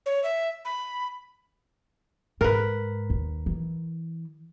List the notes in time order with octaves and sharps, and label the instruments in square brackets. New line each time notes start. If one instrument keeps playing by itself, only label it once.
[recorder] C#5
E5
B5
[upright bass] G#2 [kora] A#4 B4
[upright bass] D#2
E3